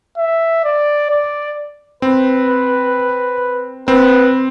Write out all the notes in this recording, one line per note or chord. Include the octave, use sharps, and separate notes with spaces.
E5
D5
D5
C4 B4
C4 B4